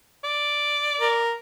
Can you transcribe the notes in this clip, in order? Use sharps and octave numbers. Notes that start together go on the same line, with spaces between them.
D5
A#4